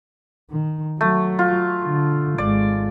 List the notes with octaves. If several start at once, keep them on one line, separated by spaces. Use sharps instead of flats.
D#3
F#3 A3
F4
D3
G#1 G#3 D5